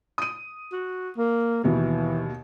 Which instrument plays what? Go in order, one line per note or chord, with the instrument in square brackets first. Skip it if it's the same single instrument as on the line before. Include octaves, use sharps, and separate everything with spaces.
[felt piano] D#6 D#7
[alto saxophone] F#4
A#3
[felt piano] D#2 B2 [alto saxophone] E3